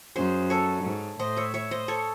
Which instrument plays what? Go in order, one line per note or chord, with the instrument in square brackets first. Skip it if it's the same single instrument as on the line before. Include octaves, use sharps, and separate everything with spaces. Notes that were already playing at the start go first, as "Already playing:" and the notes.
[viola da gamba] F#2 [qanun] G#4 C5
[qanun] A4 C#5
[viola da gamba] G#2
[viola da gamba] A2 [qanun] C5 D#5
[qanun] C#5 E5
C#5 E5
C5 D#5
A4 C#5